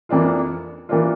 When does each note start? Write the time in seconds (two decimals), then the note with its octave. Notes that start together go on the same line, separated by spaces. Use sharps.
0.09 F2 E3 A#3 D4 F4
0.89 E3 A#3 D4 F4